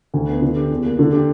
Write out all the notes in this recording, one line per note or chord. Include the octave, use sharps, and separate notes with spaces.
D2
B3
D3
G4
E2
A#3
D3
G4